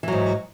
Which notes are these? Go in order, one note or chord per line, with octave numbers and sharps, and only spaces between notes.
G#2 E3 F#3